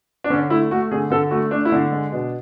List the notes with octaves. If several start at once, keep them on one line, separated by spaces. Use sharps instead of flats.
D4
D3 C#4
A3 E4
A3 F#4
D3 G#4
D3 A4
A3 F#4
A3 D4
E4
D3 D4
G#3
B2